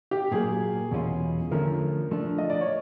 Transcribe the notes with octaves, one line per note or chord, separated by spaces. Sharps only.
G4
A#2 F#3 A#3 G#4
E2 B2 G#3 C#4 F4
D3 F3 A3 C#4 A#4
F3 A3 D4
D#5
D5
C#5